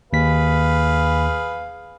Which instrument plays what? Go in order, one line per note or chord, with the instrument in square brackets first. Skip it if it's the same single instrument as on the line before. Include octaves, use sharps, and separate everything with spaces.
[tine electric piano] D#2 B6 [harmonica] G#4 B4 F5